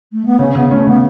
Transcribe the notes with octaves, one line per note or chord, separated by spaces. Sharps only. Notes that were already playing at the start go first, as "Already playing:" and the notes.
A3
B3
C#3 C#4
C#3 B3
A3 C#4
C#3 B3